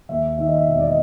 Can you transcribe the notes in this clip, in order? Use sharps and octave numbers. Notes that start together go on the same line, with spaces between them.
D#2 E5
D#3 E5
D#5
E5
E1 E5
D5
D#5